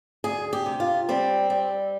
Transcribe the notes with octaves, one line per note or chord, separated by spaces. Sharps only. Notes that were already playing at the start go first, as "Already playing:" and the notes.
D2 G#4
G4
C3
F4
G3 C4
G3